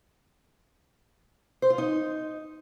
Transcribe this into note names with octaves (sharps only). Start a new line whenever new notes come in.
C5
F4
D#4